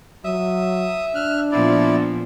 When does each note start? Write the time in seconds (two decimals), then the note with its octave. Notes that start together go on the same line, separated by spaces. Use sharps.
0.25 F#3 E5 D#6
1.15 D4 F6 F#6
1.52 A#2 F3 B3 E4 D5